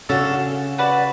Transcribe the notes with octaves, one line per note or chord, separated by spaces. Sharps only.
C#3 C#4 D4 F#4 A4
F#4 B4 D5